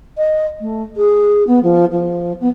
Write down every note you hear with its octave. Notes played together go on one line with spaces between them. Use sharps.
D#5
A3
G#4
B3
F3
F3
B3